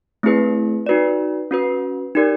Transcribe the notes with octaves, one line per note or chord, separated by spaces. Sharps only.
A3 C4 E4 G#4 B4
D#4 F#4 B4 D5
C#4 F#4 B4
D#4 G4 A#4 D5